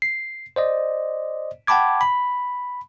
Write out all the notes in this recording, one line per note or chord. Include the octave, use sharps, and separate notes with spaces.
C7
C5 D5 D#5
F#5 G5 A5 B5 D6 G#6
B5